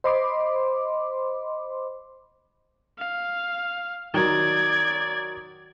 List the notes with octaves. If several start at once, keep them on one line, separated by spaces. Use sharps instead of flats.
C5 D#5 B5 C6 D6
F5
D#3 F#3 D5 G#6